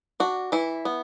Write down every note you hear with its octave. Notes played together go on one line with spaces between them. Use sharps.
D4 F#4
E3 E4
B3